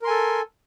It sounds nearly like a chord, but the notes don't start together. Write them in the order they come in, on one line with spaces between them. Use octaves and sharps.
A#4 C6 G#5 A4